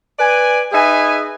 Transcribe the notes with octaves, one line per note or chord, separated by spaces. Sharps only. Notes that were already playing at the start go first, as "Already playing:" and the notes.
B4 D5 G#5
D#4 G#4 B4 E5 G#5